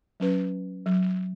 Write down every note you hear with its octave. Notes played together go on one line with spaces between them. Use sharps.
F#3 C#4 B4
F#3